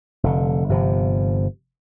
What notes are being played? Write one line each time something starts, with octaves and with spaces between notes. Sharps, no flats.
F1 D3
G1 C3 F3